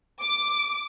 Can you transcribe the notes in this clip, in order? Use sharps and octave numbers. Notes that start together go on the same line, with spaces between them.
D6